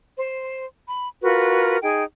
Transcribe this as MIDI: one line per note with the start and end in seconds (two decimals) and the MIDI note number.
0.18 0.67 72
0.88 1.09 83
1.23 1.77 65
1.23 1.77 66
1.23 1.77 70
1.23 1.77 71
1.82 2.04 63
1.82 2.04 68
1.82 2.04 79